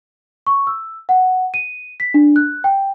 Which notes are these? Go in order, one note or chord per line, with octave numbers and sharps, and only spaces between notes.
C#6
E6
F#5
D#7
B6
D4
F#6
G5